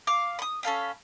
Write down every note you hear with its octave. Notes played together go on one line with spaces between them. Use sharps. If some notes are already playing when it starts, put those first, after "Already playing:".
F5 D6
B5 D#6
C#4 A4 F5 B5